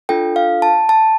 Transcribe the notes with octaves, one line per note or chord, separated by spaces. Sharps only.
D4 F4 A4 G5
F5
A5
A5